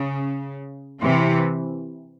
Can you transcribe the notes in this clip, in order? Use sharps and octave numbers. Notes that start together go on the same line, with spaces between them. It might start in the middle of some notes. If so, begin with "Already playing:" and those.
Already playing: C#3
C3 E3